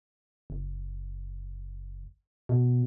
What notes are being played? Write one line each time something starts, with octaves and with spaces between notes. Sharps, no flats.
F#1
B2